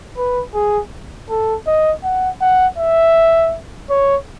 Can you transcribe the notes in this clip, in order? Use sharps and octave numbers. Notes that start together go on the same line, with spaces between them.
B4
G#4
A4
D#5
F#5
F#5
E5
C#5